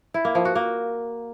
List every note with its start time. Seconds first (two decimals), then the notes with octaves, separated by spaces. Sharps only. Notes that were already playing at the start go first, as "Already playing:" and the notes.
0.14 E4
0.25 A#3
0.35 F3
0.45 F#4
0.55 A#3